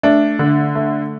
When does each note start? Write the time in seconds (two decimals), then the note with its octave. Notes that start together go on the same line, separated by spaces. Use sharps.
0.03 A3 D4
0.39 D3
0.75 A3